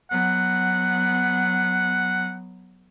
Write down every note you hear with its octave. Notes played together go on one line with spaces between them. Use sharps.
F#3 B3 F#5